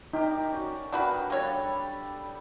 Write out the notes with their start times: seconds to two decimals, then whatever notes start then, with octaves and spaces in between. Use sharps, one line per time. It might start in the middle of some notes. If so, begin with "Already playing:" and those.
0.13 D#4 G4 A#4 D5
0.52 C#4 F#4 D5
0.92 B3 D4 F#4 G4 A#4 B4
1.30 G3 A#3 D4 A4 C#5